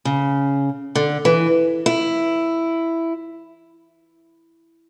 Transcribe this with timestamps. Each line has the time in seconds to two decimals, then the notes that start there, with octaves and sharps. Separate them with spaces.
0.05 C#3
0.95 D3
1.25 E3
1.86 E4